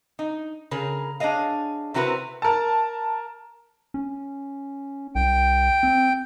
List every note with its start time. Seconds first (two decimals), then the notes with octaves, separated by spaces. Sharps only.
0.19 D#4
0.71 C#3 G#4 A#4
1.20 D4 G#4 C#5 D#5 F5
1.94 C3 C4 E4 F#4 A#4 B4
2.42 A#4 A5
3.94 C#4
5.15 C2 G5
5.83 C4